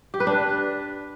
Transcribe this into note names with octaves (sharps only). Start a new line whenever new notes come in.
G4
B4
D4